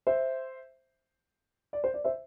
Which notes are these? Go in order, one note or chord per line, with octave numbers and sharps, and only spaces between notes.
C5 E5
D5
C5
D5
C5 E5